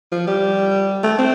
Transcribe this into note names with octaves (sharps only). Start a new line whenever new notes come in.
F3
G3
A3
C4